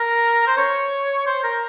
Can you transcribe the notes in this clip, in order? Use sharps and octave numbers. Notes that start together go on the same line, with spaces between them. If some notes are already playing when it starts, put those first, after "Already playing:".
Already playing: A#4
C5
C#5
C5
A#4